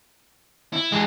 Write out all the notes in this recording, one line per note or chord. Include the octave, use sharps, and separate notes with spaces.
E4
G2 E3 G#3